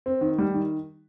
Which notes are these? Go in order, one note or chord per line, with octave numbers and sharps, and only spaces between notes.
C4
D#3
G3
D#3